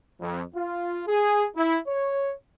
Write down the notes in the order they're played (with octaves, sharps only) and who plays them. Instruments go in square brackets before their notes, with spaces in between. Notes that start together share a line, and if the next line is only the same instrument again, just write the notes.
[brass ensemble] F2
F4
G#4
E4
C#5